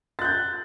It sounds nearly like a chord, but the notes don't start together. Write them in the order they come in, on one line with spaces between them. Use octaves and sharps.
A6 F#6 G6